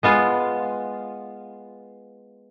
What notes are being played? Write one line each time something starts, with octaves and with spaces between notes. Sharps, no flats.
G#3 B3 F4